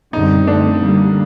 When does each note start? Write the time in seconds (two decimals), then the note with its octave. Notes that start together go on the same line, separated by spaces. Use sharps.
0.13 F#2 D3 G3 C4 D#4
0.47 D3 A3 C4 D4
0.80 D3 G3 A#3